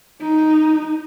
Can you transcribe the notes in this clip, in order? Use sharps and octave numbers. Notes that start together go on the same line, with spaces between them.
D#4